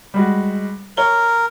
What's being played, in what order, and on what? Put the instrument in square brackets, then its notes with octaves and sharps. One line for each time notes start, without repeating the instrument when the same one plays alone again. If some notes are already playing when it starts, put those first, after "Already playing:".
[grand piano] G3 G#3 F#4
[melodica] A#4 [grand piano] C#5 G7